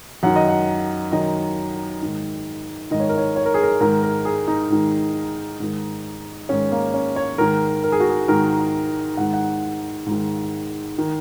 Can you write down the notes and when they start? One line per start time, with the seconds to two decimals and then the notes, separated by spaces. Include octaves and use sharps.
0.23 F#2 D#3 F#5
0.36 D#5
0.49 F#5
1.12 F#2 D#3 D#5
2.02 G#2 D#3
2.91 G#2 D#3 D#5
3.00 C#5
3.09 A#4
3.18 C#5
3.36 C#5
3.46 A#4
3.54 G#4
3.63 A#4
3.80 G#2 D#3 A#4
4.03 A#4
4.25 G#4
4.48 D#4
4.70 G#2 D#3
5.60 G#2 D#3
6.49 G#2 D#3 C#4
6.72 A#3
6.94 C#4
7.16 C#5
7.38 G#2 D#3 A#4
7.84 A#4
7.92 G#4
8.00 F#4
8.09 G#4
8.28 G#2 D#3 A#4
9.17 G#2 D#3 F#5
9.33 F#5
10.06 G#2 D#3
10.98 D#3